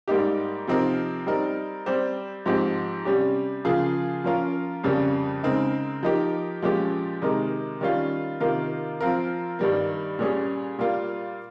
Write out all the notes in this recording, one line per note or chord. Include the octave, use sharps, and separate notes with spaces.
G#2 G3 A#3 D#4 G4
C3 F3 C4 D#4 A#4
G3 C4 D#4 A#4
G3 C4 G4 C5
G#2 F3 C4 D#4 G4
C3 G3 C#4 G4
C#3 F3 A#3 F4 G#4
F3 A#3 C#4 F4 A#4
F2 C#3 G3 A#3 C#4
C#3 G#3 C4 D#4 A#4
F3 A#3 D#4 G4 A#4
A#2 F3 G#3 C#4 G4
C3 D#3 G#3 D#4 A#4
D#3 G3 C#4 F4
C3 D#3 A#3 F4 A#4
F3 C4 F4 A#4
G2 D#3 G3 A#3
A#2 G3 C#4 G#4
A#2 G3 A#3 F4